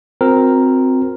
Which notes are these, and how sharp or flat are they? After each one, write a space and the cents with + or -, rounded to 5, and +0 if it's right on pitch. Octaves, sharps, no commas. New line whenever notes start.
C4 +0 F#4 -45 A#4 +0